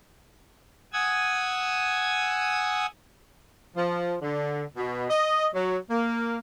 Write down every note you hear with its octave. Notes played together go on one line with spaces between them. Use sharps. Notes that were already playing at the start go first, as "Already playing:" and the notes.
F#5 G#5 D#6 E6 G#6
F3
D3
B2
D#5
F#3
A#3